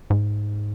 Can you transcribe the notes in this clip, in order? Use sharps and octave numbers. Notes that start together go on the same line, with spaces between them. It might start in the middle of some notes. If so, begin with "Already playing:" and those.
G#2